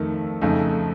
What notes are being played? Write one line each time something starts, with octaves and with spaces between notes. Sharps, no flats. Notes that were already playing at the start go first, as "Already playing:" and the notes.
Already playing: F2 D#3 A3
F2 C#3 A3 D#4